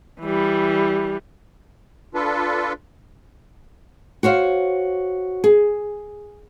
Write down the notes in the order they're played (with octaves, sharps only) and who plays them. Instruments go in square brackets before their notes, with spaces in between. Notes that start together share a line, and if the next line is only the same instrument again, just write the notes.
[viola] E3 G3
[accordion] D4 F4 A4 B4
[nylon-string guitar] F#4 C5 C#5 F5
G#4